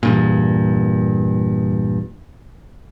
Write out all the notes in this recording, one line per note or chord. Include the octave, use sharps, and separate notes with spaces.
E2 G2 A#2